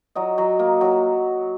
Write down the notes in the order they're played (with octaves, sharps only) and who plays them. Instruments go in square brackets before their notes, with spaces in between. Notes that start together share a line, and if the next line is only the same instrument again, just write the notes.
[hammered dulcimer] F#3 D#5
F#3
A#3
F#3